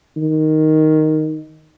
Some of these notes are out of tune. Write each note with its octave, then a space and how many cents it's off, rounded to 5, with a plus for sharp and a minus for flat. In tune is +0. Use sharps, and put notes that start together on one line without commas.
D#3 +0